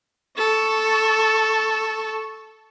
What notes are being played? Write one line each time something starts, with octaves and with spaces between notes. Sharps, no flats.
A4 C#6